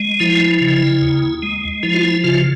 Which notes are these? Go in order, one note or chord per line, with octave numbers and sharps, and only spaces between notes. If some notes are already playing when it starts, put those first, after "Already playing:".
Already playing: G#3
F3 E4
C#3
D#2
G#3
F3 E4
F4
E4
C#3 F4